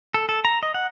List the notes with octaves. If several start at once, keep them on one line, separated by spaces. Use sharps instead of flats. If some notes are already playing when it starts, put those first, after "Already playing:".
A4
A4
A#5
D#5
F#5